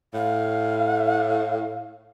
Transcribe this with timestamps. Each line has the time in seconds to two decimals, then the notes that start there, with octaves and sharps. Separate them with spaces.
0.14 A2 F5